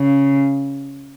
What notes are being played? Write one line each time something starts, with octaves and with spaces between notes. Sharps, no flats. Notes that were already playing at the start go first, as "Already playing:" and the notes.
Already playing: C#3